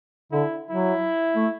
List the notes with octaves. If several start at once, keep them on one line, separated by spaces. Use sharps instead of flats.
D3 E4
F#3 E4
A3